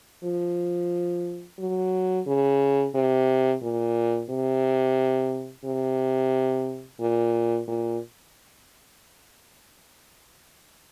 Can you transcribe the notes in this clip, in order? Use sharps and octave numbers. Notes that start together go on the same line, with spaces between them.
F3
F#3
C#3
C3
A#2
C3
C3
A#2
A#2